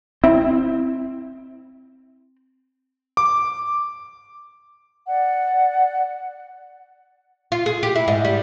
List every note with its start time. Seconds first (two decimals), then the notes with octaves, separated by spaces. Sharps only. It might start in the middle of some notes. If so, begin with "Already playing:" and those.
0.24 C4 E4
3.17 D6
5.07 D5 F#5
7.52 F4
7.66 G#4
7.83 G4
7.95 E4
8.08 G#2
8.25 G3